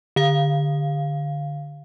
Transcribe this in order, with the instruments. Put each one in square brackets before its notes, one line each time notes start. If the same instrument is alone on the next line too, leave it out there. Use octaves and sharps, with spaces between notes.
[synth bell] D3 F5